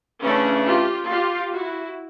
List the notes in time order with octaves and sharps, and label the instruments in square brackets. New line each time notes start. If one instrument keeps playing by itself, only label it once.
[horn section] C#3 E3 A3 D4 [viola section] C#4
[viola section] F4 G4
F4 G4
E4 F#4